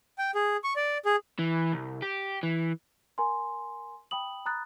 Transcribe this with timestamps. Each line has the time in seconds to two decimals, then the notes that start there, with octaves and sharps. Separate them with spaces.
0.18 G5
0.35 G#4
0.64 C#6
0.76 D5
1.05 G#4
1.39 E3
1.73 C2
2.02 G4
2.43 E3
3.18 A#4 G#5 A#5 C6
4.11 G5 B5 D#6 F#7
4.46 A#5 B5 D#6 F#6 A6